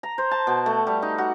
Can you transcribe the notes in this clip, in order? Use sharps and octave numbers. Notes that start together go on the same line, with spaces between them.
A#5
C5
A5
B2
A3
G3
D#4
F#4